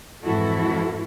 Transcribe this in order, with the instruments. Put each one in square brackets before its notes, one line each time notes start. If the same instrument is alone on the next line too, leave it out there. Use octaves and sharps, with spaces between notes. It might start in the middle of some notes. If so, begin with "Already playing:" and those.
[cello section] F2 G#2 E3 E4 F#4 A4